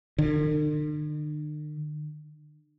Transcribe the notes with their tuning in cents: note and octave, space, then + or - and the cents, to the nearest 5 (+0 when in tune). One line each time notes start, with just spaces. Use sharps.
D3 +45